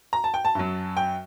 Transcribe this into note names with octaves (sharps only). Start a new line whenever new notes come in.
A#5
A5
G5
A5
F#2 F#3
G5